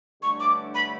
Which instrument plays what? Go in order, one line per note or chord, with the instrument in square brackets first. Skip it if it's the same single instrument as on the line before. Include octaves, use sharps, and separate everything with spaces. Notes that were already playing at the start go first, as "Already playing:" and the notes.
[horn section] G2 D3 A3 C#4 E4 [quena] C#6
[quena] D6
B5